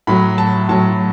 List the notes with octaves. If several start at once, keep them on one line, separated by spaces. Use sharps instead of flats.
A2 F#3 B5
A5
A2 F#3 A5